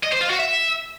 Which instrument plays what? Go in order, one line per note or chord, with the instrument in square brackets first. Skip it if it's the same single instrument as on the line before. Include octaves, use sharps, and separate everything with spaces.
[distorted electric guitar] D#5
C5
F4
F#4
E5